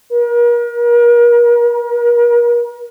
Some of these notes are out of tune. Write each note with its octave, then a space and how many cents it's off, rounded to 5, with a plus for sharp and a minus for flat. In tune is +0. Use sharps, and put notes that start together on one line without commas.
A#4 +40